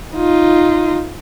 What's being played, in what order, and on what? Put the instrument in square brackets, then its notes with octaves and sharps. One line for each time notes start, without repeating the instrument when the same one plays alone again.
[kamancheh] D#4 F4